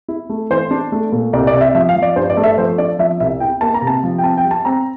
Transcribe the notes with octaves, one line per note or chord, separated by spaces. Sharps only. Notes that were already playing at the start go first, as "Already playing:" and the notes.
E4
A3
E3 C5
D4
A3
A#2
C2 D5
D5
C3
E5
F3 E5
F5
F3
D5
G2 C5
D5
A3
E5
F3 C5
D4 D5
F3 E5
C2 E5
E4 G5
A#3 A5
A#5
C3
A5
F3
G5
C4 A5
G5
G3
A5
C4 A#5